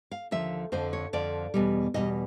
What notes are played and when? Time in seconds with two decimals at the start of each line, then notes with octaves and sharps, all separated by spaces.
0.11 F5
0.31 D#2 D3 F3 E5
0.72 F2 D3 F3 C5
0.93 C#5
1.13 F2 D3 F3 D5
1.54 E2 B2 G3
1.94 E2 B2 G3 D#5